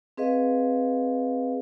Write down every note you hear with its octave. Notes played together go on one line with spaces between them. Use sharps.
C4 G#4 B4 D#5 F5